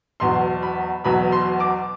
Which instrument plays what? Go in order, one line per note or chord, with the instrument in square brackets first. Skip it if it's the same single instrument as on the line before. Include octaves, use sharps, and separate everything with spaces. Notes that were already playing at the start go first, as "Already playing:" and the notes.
[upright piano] E1 E2 B2 F#3 C6
B5
E1 E2 B2 F#3 B5
C6
D6